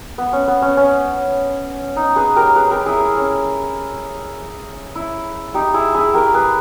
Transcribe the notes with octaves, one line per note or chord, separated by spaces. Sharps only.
B3
C#4
B3
C#4
C#4
D#4
G#4 B4
G4 A#4
G#4 B4
G4 A#4
E4 G#4
E4
C#4
E4
D#4 G4
E4 G#4
E4 G#4
G4 A#4
G#4 B4